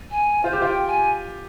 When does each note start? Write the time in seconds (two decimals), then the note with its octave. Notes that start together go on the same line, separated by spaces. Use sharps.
0.11 G#5
0.44 F4 C5
0.53 G4
0.62 F4 G5
0.87 G#5